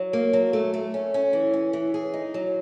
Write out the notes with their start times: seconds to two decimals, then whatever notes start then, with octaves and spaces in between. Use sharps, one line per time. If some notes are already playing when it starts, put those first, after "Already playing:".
Already playing: F#3
0.13 A#3
0.33 F#3
0.53 A3
0.74 A3
0.94 C#4
1.14 C#4
1.33 E3
1.53 C#4
1.73 E3
1.94 G#4
2.14 D#4
2.34 F#3